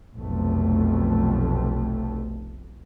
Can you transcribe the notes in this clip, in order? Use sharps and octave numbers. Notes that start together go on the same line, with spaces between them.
F1 B1 F2 A3